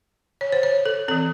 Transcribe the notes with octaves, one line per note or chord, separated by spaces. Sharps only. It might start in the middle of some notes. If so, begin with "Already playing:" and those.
C#5
C5
C#5
A4
E3 C4 A4